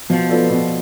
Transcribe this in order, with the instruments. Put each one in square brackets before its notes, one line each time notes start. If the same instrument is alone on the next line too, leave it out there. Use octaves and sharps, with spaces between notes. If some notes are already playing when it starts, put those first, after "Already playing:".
[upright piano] B2 [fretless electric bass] F3
[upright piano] B3 F4 A4 D5
B2